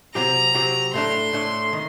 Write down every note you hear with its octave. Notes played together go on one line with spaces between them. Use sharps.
C3 F#3 C4 G4 A#5
C3 F#3 C4 G4
A2 A3 D4 C6
A2 A3 D4
D#3